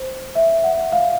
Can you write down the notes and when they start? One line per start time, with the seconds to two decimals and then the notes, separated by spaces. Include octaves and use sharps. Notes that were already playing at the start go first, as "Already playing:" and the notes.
Already playing: C5
0.35 E5
0.64 F#5
0.92 F5